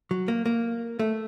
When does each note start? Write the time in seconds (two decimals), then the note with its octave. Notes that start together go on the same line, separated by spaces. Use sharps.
0.11 F#3
0.28 A#3
0.46 A#3
0.99 A3